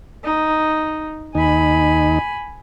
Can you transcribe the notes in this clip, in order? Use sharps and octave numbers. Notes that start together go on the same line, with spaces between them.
D#4
D#2 D#4 G#5 B5